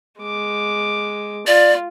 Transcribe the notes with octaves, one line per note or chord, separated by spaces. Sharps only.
G#3 D6
F4 D5